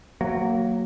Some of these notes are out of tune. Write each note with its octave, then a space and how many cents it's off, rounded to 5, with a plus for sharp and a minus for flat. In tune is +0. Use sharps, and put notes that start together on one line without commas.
F#3 +0 A#3 -20